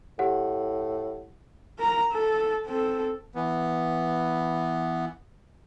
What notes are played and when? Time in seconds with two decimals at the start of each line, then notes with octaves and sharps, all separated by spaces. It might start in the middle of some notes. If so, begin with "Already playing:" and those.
0.19 A2 G4 F#5
1.78 A#4 A#5
2.11 A4
2.65 C4 A4
3.35 E3 B3